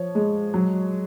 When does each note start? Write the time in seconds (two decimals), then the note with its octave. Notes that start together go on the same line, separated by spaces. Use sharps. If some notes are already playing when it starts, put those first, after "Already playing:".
Already playing: F3 C#5
0.15 G#3
0.54 F#3